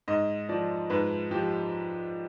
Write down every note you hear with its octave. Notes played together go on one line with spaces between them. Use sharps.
G#2 D#5
F3 D5
G#2 B4
F3 G4